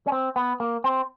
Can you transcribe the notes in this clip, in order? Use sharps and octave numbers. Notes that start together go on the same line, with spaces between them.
C#4
C4
B3
A#3
C4